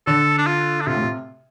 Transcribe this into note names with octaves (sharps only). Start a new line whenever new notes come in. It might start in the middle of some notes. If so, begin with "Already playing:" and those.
D3 A4
D4
F4
D4
C3 F4
A2
C3